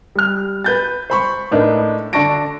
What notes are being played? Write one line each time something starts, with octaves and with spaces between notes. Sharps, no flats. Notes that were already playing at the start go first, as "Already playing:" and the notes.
G3 F6
B4 G6 A6
C5 B5 C#6
A2 D4 D#4 A#4 B4
D3 D4 A5 C#6 A#6 D7